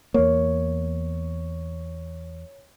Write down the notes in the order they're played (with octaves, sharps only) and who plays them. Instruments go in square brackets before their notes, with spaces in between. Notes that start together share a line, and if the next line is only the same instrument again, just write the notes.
[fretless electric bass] E2 A#3 [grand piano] C#5